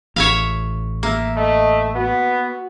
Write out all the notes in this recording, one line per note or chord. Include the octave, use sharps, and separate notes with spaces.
A1 C#5 E5 F5
A#3 E5
A3 D#5
B3 F#4